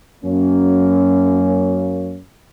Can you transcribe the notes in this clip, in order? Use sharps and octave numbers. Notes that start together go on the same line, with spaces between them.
F#2 A#3 C#4